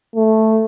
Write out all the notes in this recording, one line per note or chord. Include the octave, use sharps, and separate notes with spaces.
A3